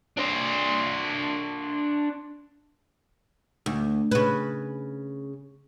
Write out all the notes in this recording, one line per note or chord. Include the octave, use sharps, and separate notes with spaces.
D4 C5
D2
C#3 B4